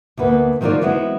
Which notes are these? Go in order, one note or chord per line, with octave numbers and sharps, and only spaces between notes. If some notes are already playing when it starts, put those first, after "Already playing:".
D2 A#3 B3 B4
D#3 F#3 C4 F4 A#4 D5
E3 G#3 B3 C4 F4 F#4